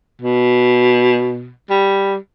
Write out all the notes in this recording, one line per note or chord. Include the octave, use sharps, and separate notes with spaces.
B2
G3